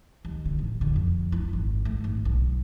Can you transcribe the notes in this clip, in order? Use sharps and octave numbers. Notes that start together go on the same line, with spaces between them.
D#2
D3
A1
D3
F2
E4
G#1
A3
G#1
B1